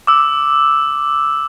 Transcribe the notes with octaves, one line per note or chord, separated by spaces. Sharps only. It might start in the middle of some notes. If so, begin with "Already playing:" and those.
D6 E6